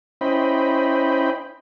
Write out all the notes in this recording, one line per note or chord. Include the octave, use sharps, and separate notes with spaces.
C#4 E4 C5 D#5 G5 B5